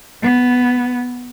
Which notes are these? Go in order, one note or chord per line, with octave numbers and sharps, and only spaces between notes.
B3